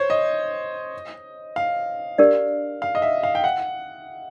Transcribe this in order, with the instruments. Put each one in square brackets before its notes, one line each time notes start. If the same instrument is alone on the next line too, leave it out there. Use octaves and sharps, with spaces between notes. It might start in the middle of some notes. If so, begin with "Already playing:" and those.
Already playing: [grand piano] C5 C#5
D#5
F5
[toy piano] D4 G4 A#4 D5
[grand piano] F5
D#5
E5
F5
G5
F#5